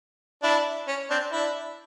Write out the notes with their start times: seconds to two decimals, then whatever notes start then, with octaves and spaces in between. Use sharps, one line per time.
0.42 D4 E4
0.88 C#4
1.10 C4 D4
1.32 D4 E4